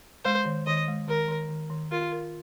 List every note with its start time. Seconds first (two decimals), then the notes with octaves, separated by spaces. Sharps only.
0.25 G#3 C5
0.45 D#3
0.66 D#3 D#5
0.88 G#3
1.08 D#3 A#4
1.28 D#3
1.49 D#3
1.70 D#3
1.92 F4 A#4
2.12 A#4